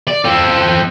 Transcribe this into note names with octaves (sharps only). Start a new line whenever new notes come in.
D5
C4 A4